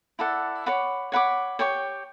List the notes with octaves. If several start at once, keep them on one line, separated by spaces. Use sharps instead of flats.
E4 A4 D5 F#5
C#5 F#5 B5 D6
C#5 F#5 B5 D6
G4 C#5 G5 C#6